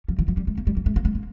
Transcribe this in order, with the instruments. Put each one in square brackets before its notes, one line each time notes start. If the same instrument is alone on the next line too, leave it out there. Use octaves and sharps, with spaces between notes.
[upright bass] F3
E3
F3
G3
A3
A#3
G3
A#3
A3
A#3
A3
A#3